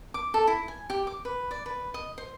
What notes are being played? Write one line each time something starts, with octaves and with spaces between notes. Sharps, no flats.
D6
A4
E4
G#5
G4
D6
B4
D5
B4
D#5
C5